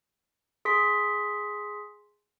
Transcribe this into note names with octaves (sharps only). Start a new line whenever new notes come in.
G#4 C6 B6